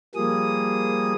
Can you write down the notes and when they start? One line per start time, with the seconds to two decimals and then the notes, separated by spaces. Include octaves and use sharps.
0.15 F3 G3 A#3 G#4 D#6